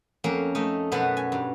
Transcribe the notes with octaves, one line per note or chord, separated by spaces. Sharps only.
F2 A#3 C#4 A#4
A3 D#4 D#5
F#2 B2 B3 B4 F#5 A5
G#5
G2